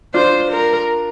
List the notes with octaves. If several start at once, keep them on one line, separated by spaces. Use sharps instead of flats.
D4 F4 C5
A#4